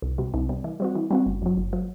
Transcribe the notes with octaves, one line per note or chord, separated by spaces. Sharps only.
C2
C3 G3
C2
C3 G3
E3
G3 C4 F#4
E3
G3 C4 F#4
G1
F#2 F#3
G1
F#3